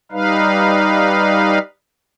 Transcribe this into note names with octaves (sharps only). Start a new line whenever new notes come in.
G3 D#4 B4 F5